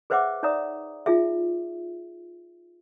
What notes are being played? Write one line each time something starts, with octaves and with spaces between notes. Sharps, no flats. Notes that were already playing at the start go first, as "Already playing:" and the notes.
G#4 B4 C5 E5 F#5 D6
D#4 C#5 D5 E5 A#5 D#6
D#4 F4 G#4 E5